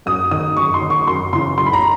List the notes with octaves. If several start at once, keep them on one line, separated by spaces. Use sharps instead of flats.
F#2 D#6
D#3 D#6
F#2 C#6
C6
D#3
C#6
F#2 C6
C#3 E3 C6
F#2 C6
B5
A#5